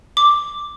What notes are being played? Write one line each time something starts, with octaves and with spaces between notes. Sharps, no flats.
D6